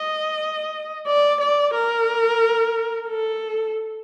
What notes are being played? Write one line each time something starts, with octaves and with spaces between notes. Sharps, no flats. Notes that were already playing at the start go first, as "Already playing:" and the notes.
Already playing: D#5
D5
D5
A#4
A4